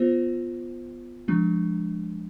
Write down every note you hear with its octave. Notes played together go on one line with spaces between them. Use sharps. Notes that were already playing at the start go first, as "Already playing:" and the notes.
Already playing: B3 F4 C5
F3 G#3 D4